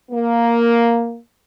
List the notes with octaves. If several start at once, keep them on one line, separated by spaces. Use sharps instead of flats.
A#3